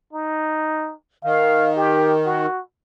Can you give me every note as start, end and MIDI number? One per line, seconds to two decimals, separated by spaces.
0.13 0.93 63
1.24 2.46 51
1.24 1.76 77
1.76 2.13 67
2.26 2.61 66